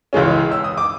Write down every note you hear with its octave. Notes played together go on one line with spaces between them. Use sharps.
C#2 C#3 E3 G#3 C#4
E6
D#6
D6